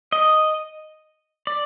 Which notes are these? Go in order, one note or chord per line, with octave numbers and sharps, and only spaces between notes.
D#5
D5